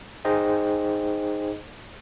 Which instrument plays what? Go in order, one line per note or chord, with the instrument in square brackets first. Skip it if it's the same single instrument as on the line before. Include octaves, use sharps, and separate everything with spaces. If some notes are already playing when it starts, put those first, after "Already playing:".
[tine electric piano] D#4 G#4 C5 D#5 G5